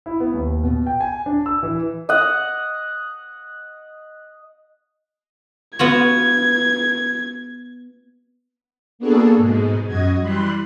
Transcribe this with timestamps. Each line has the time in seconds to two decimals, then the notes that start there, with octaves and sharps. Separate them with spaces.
0.06 E4
0.20 B3
0.34 D#2
0.64 B2
0.87 G5
1.01 G#5
1.26 D4
1.46 E6
1.63 E3
2.09 D#5 F#5
5.79 B3 F4 F#4 G#6
8.99 A#3 B3 D4 F#4 G#4 A4
9.36 G#2 B2 G#3
9.87 F#2 F#4 D#5 G#6
10.20 E3 G3 B5 C6 F#6